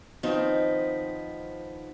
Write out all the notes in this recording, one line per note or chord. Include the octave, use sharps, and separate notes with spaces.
D#3 F3 B3 C4 D#4